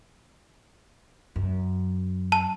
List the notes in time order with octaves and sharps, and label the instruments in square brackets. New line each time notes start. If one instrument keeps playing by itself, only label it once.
[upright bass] F#2
[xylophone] A5